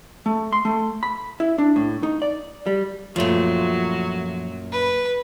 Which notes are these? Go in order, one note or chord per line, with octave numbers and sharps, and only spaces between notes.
A3
C6
A3
B5
E4
D4
A2
D#4
D5
G3
F#2 A#2 F3 F#3 A3
B4